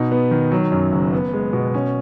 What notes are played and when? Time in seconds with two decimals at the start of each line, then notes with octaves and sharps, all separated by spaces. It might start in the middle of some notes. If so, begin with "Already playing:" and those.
Already playing: B2 D#4
0.12 B3
0.31 D#3
0.52 F#3
0.72 F#2
0.92 F#1
1.13 B3
1.33 G#3
1.53 B2
1.74 C#4